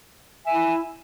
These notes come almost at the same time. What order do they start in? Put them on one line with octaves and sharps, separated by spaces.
E5 G#5 E4